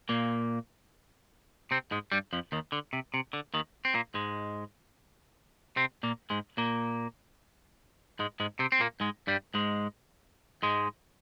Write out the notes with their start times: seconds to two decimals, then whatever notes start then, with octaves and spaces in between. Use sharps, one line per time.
0.09 A#2 A#3
1.71 C3 C4
1.91 G#2 G#3
2.12 G2 G3
2.33 F2 F3
2.52 D#2 D#3
2.72 D3
2.93 C3
3.14 C3
3.33 D3
3.54 D#2 D#3
3.85 C4
3.94 A#2 A#3
4.14 G#2 G#3
5.76 C3 C4
6.03 A#2 A#3
6.30 G#2 G#3
6.57 A#2 A#3
8.19 G#2 G#3
8.40 G#2 G#3
8.59 C3 C4
8.72 C4
8.80 A#2 A#3
9.00 G#2 G#3
9.27 G2 G3
9.54 G#2 G#3
10.63 G#2 G#3